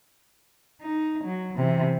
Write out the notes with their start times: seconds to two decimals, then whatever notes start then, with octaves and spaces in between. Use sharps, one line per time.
0.82 D#4
1.24 F#3
1.57 C3 E3